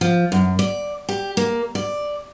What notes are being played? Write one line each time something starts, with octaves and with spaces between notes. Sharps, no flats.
F3
F#2
D5
G4
A#3
D5